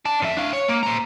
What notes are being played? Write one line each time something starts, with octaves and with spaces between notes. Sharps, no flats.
D5 A5
F2 E5
D4 F5
C#5
A#3
C5 A#5